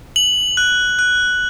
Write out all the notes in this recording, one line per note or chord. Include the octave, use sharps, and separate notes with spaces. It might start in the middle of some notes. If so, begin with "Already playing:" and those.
F#7
F#6
F#6